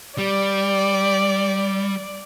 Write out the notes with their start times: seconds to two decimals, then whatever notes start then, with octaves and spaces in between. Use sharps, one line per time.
0.18 G3 D5